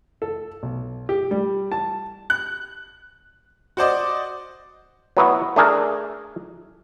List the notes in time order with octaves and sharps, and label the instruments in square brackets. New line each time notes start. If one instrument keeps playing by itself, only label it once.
[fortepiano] A4
B1
G4
G3
A5
[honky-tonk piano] F#6
F#4 C5 D5 D#5
[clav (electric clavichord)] F#3 B3 E4 F#4
A3 D4 G#4 A#4